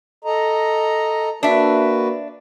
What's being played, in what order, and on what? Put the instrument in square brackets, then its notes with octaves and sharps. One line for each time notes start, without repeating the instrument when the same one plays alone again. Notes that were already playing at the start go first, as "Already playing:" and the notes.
[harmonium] A4 D#5 A#5
[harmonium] A#3 F#4 B4 [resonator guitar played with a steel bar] D4 E5